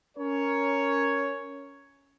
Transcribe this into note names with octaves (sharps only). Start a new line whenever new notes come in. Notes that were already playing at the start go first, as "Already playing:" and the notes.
C#4 A#4 C#5